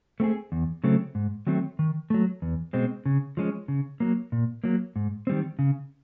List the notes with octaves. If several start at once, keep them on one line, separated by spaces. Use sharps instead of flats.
A3 C4 F4 G#4
E2
C#3 F#3 A3 C4
G#2
D#3 F#3 A3 C4
D#3
F#3 A3
E2
B2 G#3 C4
C#3
F3 G#3 C#4
C#3
F#3 A#3
A#2
F#3 A#3
G#2
D#3 G3 C4
C#3